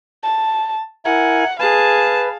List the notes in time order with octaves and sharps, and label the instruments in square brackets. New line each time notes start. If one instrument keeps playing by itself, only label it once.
[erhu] A5
[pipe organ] E4 A#4 G#5 [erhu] F#5
[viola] G#4 A5 [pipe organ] B4 [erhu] F5